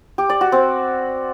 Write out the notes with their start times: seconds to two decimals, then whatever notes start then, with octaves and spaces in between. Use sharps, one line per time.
0.18 G4
0.30 D5
0.41 F#4
0.52 C4